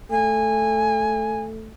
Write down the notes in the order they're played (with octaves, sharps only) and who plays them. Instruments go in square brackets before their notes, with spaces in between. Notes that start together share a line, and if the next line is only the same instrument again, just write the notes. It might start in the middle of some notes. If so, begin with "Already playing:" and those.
[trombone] A3 [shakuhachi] G#5